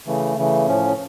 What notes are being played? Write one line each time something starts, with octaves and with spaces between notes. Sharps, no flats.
C#3 E3 A3
C#3 E3 A3
A2 F3 C#4